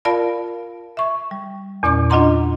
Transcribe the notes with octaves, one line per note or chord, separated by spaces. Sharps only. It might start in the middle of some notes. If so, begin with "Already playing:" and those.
F4 A#4 D5 F5 A5 B5
E5 C#6
G3
E2 A#2 C#4 D5 D6
D4 F4 D#5 F#5 A#5 C6